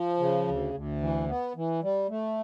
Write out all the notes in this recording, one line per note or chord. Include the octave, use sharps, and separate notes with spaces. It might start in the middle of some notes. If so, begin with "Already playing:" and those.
Already playing: F3
C#3
D2
D2
E3
B3
E3
G3
A3